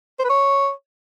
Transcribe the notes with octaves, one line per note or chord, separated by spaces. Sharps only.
C5
B4
C#5